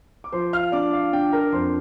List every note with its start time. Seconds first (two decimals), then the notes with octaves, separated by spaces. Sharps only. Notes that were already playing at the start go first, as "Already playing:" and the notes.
0.24 D6
0.32 F3 C5 C6
0.53 F5 F6
0.72 D4 D5 D6
0.93 F5
1.12 D4 G5
1.33 A#4 A#5
1.52 F2 C5 C6